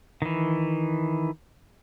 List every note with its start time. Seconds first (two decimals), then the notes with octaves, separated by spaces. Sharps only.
0.22 D#3 E3